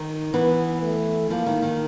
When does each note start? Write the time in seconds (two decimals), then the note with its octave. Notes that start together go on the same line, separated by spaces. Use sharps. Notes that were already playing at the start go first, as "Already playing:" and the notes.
Already playing: D#3
0.34 E3 B3
0.82 A3
1.30 F3 A#3
1.46 D#3
1.62 D#3